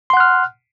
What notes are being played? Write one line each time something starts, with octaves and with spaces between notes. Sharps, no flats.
F#5 C6 F6 F#6